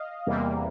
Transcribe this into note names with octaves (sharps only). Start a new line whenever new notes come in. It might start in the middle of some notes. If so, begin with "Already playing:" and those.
Already playing: D#5 F5
E2 C3 E3 G3 A#3